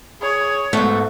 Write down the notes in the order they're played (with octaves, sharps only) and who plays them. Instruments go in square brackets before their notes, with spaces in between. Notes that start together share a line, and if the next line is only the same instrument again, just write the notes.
[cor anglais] G#4 [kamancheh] C#5
[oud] G#2 B3 [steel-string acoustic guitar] A3 [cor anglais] F#4